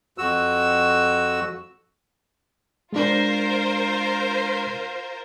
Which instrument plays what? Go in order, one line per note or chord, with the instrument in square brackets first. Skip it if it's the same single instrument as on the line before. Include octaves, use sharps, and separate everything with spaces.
[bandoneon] F2 F#4 E6
[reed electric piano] G#3 D4 [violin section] F4 A#4 C5